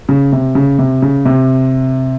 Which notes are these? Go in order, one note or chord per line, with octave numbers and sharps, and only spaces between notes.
C#3
C3
C#3
C3
C#3
C3